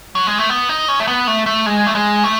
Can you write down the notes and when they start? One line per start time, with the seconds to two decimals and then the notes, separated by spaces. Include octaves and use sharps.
0.15 F#3
0.27 G#3
0.38 A3
0.49 B3
0.69 D#4
0.88 C#4
1.00 A3
1.08 B3
1.27 A3
1.46 A3
1.66 G#3
1.87 A3
1.95 G#3
2.24 A3